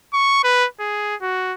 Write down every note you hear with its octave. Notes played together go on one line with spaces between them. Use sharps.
C#6
B4
G#4
F#4